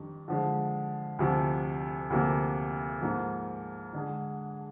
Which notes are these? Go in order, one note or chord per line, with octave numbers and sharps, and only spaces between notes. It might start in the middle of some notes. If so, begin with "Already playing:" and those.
Already playing: F2 D#3 G3 D4
D3 F3 G#3
D2 C3 F3
D2 C3 F3 A#3
G#2 F3 A#3
D3 G#3 D4 G#4